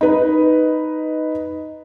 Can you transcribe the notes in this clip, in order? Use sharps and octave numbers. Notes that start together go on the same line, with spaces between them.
D#4 B4